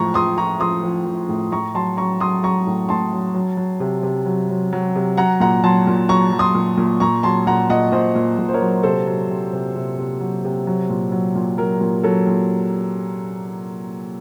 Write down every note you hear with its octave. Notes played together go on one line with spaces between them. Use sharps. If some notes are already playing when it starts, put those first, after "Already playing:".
Already playing: A2 F3 A#5 C#6
F3 C6 D#6
F3 A#5 C#6
F3 C6 D#6
F3
F3
A2
A2 A#5 C#6
F#3 A5 C6
F#3 A#5 C#6
F#3 C6 D#6
F#3 A#5 C#6
A2
A2 A5 C6
F#3
F#3
F#3
C3
C3
F#3
F#3
F#3
C3
F#3 F#5 A#5
A#2 F#5 A#5
F#3 A5 C6
A#2
F#3 A#5 C#6
F#3
C6 D#6
A#2
A#2
A#2 A#5 C#6
F#3 A5 C6
A#2 F#5 A#5
A#2 D#5 F#5
A#2 C5 D#5
A#2
A#2
C5
A#4 C#5
F#3
C3 A4 C5
F#3
C3
C3
C3
C3
F#3
C3
F#3
A#2
F#3
A#2
F#3 A#4
A#2
F#3 A4
A#2